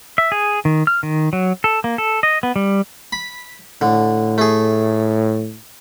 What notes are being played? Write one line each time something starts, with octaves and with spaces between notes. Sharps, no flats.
E5
G#4
D#3
F6
D#3
F#3
A4
A#3
A4
D#5
B3
G3
B5
A2 D3
A3 G#4